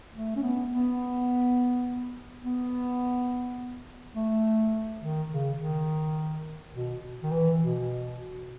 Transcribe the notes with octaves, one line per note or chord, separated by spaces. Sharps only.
A3
C#4
B3
B3
B3
A3
D#3
C#3
D#3
B2
D#3
E3
B2